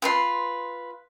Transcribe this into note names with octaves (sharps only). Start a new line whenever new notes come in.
F4 B4 C6